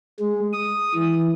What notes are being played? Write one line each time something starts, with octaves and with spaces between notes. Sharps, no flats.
G#3
D#6
E3